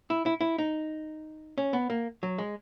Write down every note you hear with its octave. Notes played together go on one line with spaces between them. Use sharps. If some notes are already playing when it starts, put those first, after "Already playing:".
E4
E4
E4
D#4
C#4
B3
A#3
F#3
G#3